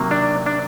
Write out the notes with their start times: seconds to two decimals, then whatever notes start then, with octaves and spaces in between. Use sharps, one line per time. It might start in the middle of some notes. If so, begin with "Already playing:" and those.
Already playing: C3 D#3 F#3 A#3
0.11 D4
0.46 D4